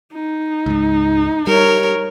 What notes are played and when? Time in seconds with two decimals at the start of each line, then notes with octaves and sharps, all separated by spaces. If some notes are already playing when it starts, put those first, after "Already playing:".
0.13 D#4
0.66 C#2 G#2
1.47 G3 A#4 C#5